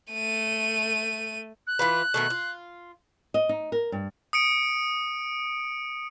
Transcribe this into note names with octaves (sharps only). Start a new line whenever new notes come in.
A3 D#7
F#6
E3 F4 B4
B2 D#3 A3
F4
D#5
D#4
A#4
G2
D#6 C#7 D7